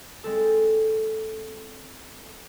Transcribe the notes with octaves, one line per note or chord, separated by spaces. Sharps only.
G#3 C4 A4